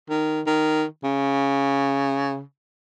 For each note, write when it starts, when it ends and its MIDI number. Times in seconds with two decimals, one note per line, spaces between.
0.10 0.41 51
0.47 0.85 51
1.04 2.41 49